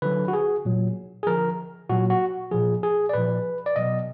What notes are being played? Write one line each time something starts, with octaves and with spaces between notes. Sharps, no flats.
D3 F#3 B4
F#4
G#4
A#2 F#3
G#4
D3 F3 A#4
A#2 F#3 F#4
F#4
A#2 F3 G#4
G#4
D5
A#2 F3 B4
D5
B2 F#3 D#5